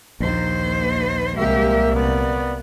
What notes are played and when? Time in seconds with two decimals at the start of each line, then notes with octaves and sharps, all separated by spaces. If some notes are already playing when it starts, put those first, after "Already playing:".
0.20 A#1 D#2 C5
1.37 C2 C3 G#3 A#3 G4 E5
1.96 B3 D5